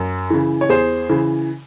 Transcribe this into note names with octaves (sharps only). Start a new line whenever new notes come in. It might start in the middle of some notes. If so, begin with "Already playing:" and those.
Already playing: F#2
C#3 E3
C#5
E2 G#4 C5
C#3 E3